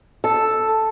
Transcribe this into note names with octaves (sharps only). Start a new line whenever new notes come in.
A4